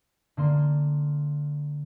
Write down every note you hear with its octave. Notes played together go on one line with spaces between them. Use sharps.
D3 A#3 C6